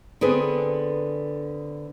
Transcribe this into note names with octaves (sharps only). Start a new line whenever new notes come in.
D3 B3 C4 G#4 B4